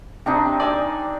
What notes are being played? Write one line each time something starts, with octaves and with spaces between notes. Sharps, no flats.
C3 C4 D4 D#4
D5 G#5 E6